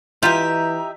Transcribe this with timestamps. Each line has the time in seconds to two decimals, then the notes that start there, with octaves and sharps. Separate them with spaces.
0.23 E3 F4 G4 D#5 E5 A#5